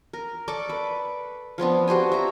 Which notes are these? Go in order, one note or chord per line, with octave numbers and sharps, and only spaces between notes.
A#4
A4 D5 C#6 D6
B4
F3 B3 C4 D4
F#4 G4 C5 G#5
E5 A#5